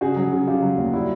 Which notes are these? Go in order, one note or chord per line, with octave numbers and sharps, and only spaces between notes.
C#3 F#4 G#4
F#3
C#3
C#3 F4 G4
F#3
D#2
G3 E4 F#4